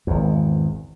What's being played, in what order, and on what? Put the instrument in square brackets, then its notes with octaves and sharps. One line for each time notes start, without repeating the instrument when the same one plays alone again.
[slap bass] G#1 E2